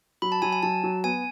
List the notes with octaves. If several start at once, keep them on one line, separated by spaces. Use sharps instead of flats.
F#3 B5
A5
F#3 G#5
G#5
F#3 A5
F#3
B3 G#5